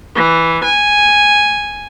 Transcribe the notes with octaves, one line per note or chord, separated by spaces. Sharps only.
E3
G#5